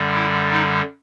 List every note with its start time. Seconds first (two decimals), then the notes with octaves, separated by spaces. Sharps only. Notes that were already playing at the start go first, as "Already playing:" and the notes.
Already playing: F#2 D3 G3
0.15 E4
0.51 D#4